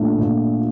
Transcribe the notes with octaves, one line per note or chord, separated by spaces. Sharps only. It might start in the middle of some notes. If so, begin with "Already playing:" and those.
Already playing: A#2 A3 D4
A#2